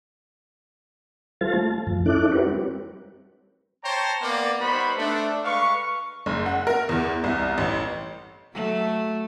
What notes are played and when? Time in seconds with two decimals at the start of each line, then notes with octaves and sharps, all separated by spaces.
1.41 G3 F4 A4 C5 F5 A6
1.54 A3 A5
1.87 F#2 F3
2.06 C#4 D#4 E4 A4 D6 F#6
2.32 E4 F#4 G4 A#4 B4 C#5
2.46 G3 C4
3.84 C5 C#5 G5 A5 A#5 C#6
4.21 A#3 B3 D5
4.60 G3 B3 D#4 C5 B5 C#6
4.97 A3 D4
5.45 G#3 B4 F5 C#6
6.26 F#1
6.46 F#5
6.67 A#4
6.89 E2
7.24 C2
7.58 A1
8.54 F#3 A3